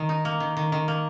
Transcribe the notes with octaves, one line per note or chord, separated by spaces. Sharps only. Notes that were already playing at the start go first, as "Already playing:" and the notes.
Already playing: D#3
D#4
A#3
D#3
D#3
D#3
A#3